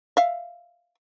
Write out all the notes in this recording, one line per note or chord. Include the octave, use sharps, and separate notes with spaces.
E5 F5